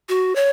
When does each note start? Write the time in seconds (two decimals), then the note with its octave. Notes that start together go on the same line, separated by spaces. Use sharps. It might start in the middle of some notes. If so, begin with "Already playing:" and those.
0.09 F#4
0.35 C#5